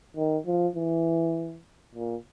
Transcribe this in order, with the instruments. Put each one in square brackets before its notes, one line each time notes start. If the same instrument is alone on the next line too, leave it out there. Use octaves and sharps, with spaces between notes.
[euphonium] D#3
F3
E3
A#2